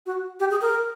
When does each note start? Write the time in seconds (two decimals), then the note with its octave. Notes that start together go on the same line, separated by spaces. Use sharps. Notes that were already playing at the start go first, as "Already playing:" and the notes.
0.06 F#4
0.40 G4
0.51 G#4
0.61 A#4